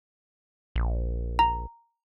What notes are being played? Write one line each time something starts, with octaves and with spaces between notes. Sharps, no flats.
A#1
A#5